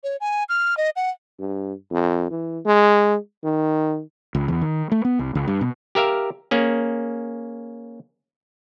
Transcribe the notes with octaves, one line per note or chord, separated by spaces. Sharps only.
C#5
G#5
F6
D#5
F#5
G2
F2
E3
G#3
D#3
C#2
E2
D#3
A3
B3
C2
C#2
G2
B2
G4 A#4 E5 F5
A#3 C#4 G#4